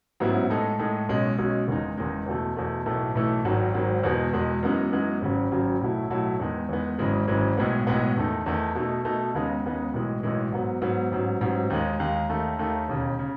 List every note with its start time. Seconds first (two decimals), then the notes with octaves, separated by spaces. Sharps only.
0.20 A1 G#2 F#3 B3 E4
0.50 A2 G#3 D#4 A4
0.79 A2 G#3 D#4 A4
1.09 B1 B2 G#3 C#4
1.38 B1 B2 G#3 C#4
1.68 F#1 E2 D#3 G#3 D#4
1.97 F#1 E2 D#3 G#3 D#4
2.26 E2 B2 A3
2.56 E2 B2 A3
2.86 B1 A2 E3 A3
3.15 B1 A2 E3 A3
3.45 G#1 G#2 D#3 F#3
3.74 G#1 G#2 D#3 F#3
4.03 E2 B2 G#3
4.33 E2 B2 G#3
4.63 F#2 E3 G#3 B3 D#4
4.92 F#2 E3 G#3 B3 D#4
5.22 G#1 F#2 C#3 F#3
5.51 G#1 F#2 C#3 F#3
5.81 B1 A2 F#3 A3 E4
6.10 B1 A2 F#3 A3 E4
6.40 E2 D#3 G#3 B3
6.69 E2 D#3 G#3 B3
6.99 G#1 F#2 C#3 E3 G#3
7.28 G#1 F#2 C#3 E3 G#3
7.57 B1 A2 G#3 B3
7.87 B1 A2 G#3 B3
8.16 E2 D#3 A3 D#4
8.46 E2 D#3 A3 D#4
8.75 B2 A3 D#4
9.05 B2 A3 D#4
9.34 D#2 C#3 G#3 B3 D#4
9.64 D#2 C#3 G#3 B3 D#4
9.93 B1 A2 E3 G#3
10.23 B1 A2 E3 G#3
10.52 G#2 F#3 B3
10.82 G#2 F#3 B3
11.11 A1 G#2 F#3
11.41 A1 G#2 F#3
11.70 D#2 D#3 G#3
12.00 D#2 D#3 G#3
12.29 D#2 D#3 A3
12.59 D#2 D#3 A3
12.88 E1 D#2 C#3
13.19 C#3